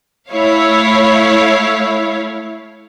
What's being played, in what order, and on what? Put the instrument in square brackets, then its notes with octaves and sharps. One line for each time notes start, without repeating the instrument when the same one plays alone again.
[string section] A3 E4 C#5 F5